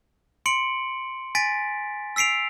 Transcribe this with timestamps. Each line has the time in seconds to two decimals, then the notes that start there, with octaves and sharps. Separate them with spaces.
0.46 C6 C#7 D7 F#7
1.35 G#5 A6 B6 D7
2.16 E6 B6 C7 D7 F7